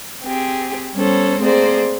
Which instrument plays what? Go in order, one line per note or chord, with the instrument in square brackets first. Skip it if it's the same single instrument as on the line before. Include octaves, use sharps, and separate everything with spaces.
[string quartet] C4 G4 G#4
G3 B3 C#4 A4 C5
A3 A#3 C4 G#4 C5 D5